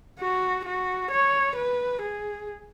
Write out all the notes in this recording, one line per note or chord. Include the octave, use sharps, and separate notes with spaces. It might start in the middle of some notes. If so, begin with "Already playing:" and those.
F#4
F#4
C#5
B4
G#4